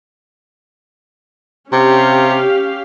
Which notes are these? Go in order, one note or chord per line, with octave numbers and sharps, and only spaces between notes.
C3 C#4 G4 F5